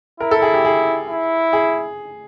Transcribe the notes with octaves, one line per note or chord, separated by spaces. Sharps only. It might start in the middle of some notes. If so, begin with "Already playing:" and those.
E4 A#4
A4
G#4
G4
G#4
E4
G#4